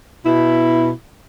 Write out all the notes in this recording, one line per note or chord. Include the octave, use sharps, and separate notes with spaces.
B2 E4